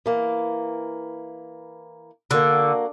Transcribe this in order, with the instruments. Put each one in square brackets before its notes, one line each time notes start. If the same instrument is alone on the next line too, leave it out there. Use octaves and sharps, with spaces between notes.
[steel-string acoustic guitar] E3 A#3
[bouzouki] D3 [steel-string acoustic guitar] A#3 F#4